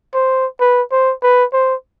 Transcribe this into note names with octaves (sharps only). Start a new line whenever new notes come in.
C5
B4
C5
B4
C5